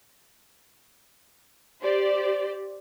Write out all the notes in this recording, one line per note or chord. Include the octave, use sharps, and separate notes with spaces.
G4 C5 D5